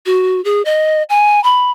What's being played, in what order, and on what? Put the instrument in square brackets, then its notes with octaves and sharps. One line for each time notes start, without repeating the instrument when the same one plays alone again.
[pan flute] F#4
G#4
D#5
G#5
B5